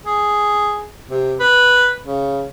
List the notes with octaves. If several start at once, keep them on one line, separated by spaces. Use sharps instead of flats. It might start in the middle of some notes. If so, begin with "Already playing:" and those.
G#4
C3
B4
C#3